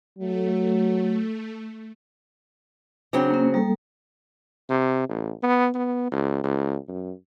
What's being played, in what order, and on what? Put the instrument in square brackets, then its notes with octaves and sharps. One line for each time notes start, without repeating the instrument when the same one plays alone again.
[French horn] F#3 [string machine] A3
[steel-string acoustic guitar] C#3 F#3 C4 [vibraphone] D4
[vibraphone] A#3 C#4
G3 A#3 A4
[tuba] C3
A1
B3
B3
C#2
C#2
F#2